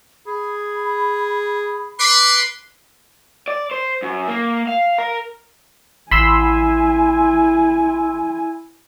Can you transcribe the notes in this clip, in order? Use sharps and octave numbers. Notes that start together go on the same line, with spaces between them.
G#4 B5
B4 C6 D6
D5
C5
F#2
A#3
F5
A#4 A#5
A1 E4 G#5 B5 C6 E6